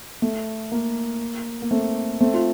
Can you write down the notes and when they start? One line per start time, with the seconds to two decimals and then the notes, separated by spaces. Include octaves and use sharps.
0.22 A3
0.72 A#3
1.62 A#3
1.71 A3 C4
2.20 A3 C4
2.34 F4